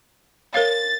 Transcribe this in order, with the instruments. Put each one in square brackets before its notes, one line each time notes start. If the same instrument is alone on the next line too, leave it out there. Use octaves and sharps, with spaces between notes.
[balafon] A#4 C#5 F5 [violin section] A6